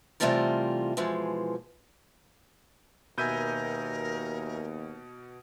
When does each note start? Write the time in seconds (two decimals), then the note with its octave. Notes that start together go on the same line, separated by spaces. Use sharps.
0.20 C3 E3 G3 A3 F4 A#4
0.97 B2 E3 F3 G#3
3.18 D#2 B2 A#4 B4 E5 G#5 G6 D#7